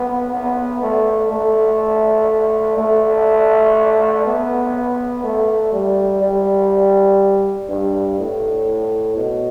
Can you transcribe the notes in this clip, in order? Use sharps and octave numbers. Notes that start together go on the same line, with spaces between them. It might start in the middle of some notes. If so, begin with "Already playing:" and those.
Already playing: B3
B3
A3
A3
A3
B3
A3
G3
G3
G2
A2
B2